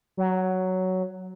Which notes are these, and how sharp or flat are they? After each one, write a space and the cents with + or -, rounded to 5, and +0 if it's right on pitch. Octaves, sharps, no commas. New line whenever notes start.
F#3 +5